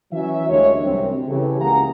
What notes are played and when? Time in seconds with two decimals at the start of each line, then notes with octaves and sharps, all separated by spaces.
0.13 E3 F#3 C#4 F#4 E5
0.49 D2 G#3 A#3 D4 G4 C#5
0.83 C2 F#2 C3 G3 C4
1.29 C#3 E3 G4 A4
1.61 C#2 A#3 G#4 F#5 A#5